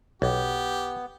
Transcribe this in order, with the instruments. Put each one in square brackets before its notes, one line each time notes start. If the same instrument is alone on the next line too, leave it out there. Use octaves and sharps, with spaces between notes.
[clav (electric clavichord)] B1 [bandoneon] B3 [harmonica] G4